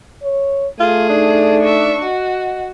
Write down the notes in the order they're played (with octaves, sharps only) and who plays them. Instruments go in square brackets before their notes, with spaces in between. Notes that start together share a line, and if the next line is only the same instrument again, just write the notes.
[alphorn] C#5
[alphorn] A3 [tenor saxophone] F4 [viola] G#4
[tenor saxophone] D4 [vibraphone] D#4
[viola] E5 C#6
[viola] F#4 [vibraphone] D#5 F#5